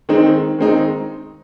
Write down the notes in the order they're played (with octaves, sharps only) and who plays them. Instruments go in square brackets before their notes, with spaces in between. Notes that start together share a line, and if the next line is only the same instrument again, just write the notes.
[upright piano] D#3 G#3 C4 D#4
D#3 G#3 C4 D#4